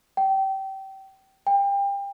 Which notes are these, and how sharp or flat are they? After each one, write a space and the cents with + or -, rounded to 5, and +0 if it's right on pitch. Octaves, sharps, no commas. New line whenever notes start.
G5 -25
G5 +30